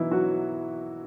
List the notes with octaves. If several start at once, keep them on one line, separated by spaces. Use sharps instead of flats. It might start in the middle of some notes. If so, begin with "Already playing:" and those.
Already playing: B1 B2 E3 F#3 D#4 E4
F#3 F#4